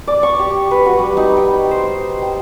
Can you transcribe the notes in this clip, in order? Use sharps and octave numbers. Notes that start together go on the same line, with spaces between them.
D5
C#6
G4
B4
F#4
G3
D#4
G5
C5
G5